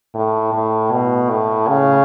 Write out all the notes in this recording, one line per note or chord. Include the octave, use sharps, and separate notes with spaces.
A2
A2
B2
A2
C#3